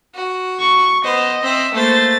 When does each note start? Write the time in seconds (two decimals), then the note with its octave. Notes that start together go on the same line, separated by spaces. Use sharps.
0.15 F#4
0.60 C#6
1.04 B3 C5 D#5
1.43 C4 E5
1.74 A3 A#3 C5 A6